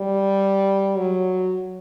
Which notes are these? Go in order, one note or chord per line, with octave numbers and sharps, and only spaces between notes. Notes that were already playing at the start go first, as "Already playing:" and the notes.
Already playing: G3
F#3